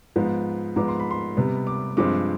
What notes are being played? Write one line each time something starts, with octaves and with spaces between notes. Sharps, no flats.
G#2 F3 B3
G#2 F3 B3 D6
C6
B5
C6
C3 G3 B3
D6
G2 F3 G#3 C4 D6